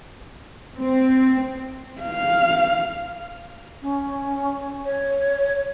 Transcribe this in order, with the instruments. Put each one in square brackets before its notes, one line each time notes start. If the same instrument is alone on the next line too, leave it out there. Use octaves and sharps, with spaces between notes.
[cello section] C4
[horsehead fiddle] F5
[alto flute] C#4
C#5